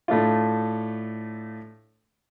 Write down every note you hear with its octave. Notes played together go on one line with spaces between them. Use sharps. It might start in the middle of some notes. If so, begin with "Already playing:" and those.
A2 A3 D4 F4